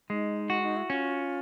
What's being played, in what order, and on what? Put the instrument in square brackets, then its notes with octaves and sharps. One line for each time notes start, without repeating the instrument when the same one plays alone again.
[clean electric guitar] G#3 [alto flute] D#4
[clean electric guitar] F#4
[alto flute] D#4
E4
[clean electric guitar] C#4 [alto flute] F4